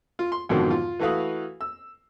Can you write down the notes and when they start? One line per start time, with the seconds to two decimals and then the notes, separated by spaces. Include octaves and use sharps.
0.19 F4
0.32 C6
0.49 F2 G#2 B2 D3 D#3 F#3
0.70 F4
0.99 E3 A3 F#4 B4 F5 D#6
1.61 E6